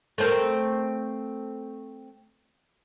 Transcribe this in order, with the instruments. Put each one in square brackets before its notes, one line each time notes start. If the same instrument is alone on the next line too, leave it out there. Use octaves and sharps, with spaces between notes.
[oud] A3 C4 A#4